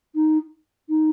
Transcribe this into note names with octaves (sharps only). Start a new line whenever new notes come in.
D#4
D#4